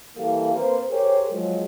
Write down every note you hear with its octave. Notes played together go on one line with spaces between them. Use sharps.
E3 G3 A#3 G4 A4 F5
A#3 C4 B4 C5
G4 G#4 A#4 C5 C#5
F3 F#3 G#3